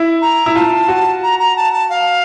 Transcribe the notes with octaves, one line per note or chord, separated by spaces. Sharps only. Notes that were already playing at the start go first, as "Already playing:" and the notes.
Already playing: E4
A#5
E4
F4 A5
F#4
A#5
A#5
A5
A5
F5